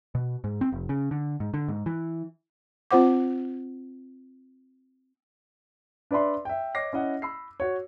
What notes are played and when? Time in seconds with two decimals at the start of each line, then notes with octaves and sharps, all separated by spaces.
0.15 B2
0.44 G#2
0.61 C4
0.72 F1
0.89 C#3
1.11 D3
1.40 G#2
1.54 D3
1.68 G#2
1.86 E3
2.91 C4 F4 C5 F#5 D6
6.11 D4 B4 D5 E5 B5 C6
6.45 E5 G5
6.75 C#5 D#5 D6 A#6 C7
6.93 C#4 E4 D#5 F#5
7.22 B5 E6 C7
7.60 F#4 C#5